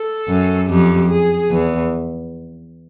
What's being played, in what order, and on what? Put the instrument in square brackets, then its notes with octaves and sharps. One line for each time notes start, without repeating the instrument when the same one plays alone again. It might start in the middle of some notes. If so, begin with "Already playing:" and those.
Already playing: [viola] A4
[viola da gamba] F#2
[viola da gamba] F2 [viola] G4
[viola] G#4
[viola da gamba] E2